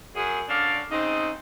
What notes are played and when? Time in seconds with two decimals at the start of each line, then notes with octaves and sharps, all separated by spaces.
0.15 F#2 G#4
0.49 D3 C#4 D4 D5 F5
0.91 C#3 C4 D#4